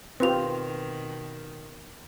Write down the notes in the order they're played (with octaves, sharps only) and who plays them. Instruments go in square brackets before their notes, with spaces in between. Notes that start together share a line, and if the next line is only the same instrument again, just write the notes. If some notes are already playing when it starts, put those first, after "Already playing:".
[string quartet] B2 D#3 [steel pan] C4 F4 G4 [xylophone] B4 F7